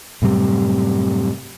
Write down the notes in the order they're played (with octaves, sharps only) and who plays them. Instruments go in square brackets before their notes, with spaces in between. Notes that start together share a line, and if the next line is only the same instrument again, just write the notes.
[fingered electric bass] F#2 A2 C3 G3